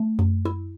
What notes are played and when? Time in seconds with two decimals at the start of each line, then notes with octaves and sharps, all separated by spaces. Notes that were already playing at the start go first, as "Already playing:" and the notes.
Already playing: A3
0.19 F#2
0.45 E4